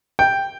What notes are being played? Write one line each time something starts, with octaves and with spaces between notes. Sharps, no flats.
G5